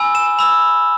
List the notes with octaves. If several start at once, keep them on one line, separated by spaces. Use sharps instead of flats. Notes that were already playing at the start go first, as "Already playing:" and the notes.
Already playing: G#5 B5 E6
E7
B5 E6